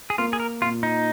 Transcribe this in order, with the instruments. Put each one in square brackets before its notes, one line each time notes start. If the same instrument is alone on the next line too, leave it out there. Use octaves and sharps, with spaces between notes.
[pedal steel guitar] G#4
[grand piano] A#3 [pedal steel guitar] F4
[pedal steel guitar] G#4
A#4
[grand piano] A#2 [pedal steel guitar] F4
[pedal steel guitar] D#4